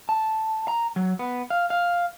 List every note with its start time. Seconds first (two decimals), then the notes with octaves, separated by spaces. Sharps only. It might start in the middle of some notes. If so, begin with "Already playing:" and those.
0.09 A5
0.68 A#5
0.96 F#3
1.19 B3
1.50 F5
1.70 F5